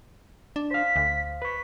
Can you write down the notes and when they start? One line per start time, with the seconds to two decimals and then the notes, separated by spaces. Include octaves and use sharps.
0.56 D4
0.71 C5 F5 B6
0.96 D2
1.42 B4 C#6 B6